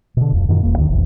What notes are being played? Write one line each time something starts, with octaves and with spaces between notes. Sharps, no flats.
B2 D3
D1 F2
F#2 A#2 D#3 E3
E1 E2 A#3
D2 G2 D3 D#3
F1 A#1 E2